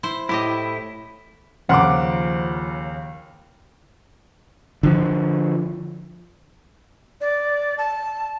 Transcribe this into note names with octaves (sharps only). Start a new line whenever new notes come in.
E4 C5
A2 E4 G4 D#5
D#2 C#3 F3 A#4 F#5 C6 D6
D3 F3
D5
A5